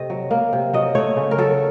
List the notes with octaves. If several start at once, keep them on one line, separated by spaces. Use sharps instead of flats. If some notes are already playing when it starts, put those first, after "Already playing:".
Already playing: C3 A3 D#5
F#3
A#3
C3
F#3 D#5
A3 C#5
C#3
A#4
F#3 A4